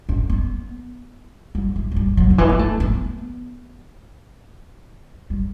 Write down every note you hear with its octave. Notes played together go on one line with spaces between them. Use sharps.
C#4
B3
G3
E3
F#3
G3
F#3
D3
E3
B3
A3
B3
G3